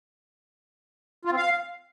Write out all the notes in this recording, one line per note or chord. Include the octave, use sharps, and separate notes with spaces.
F4
C4
F5